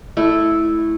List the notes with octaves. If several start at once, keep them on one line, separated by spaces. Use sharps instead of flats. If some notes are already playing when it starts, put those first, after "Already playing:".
A3 E4